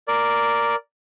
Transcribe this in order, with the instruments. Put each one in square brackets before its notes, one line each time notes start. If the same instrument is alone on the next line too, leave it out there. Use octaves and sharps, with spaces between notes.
[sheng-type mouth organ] A#4 D5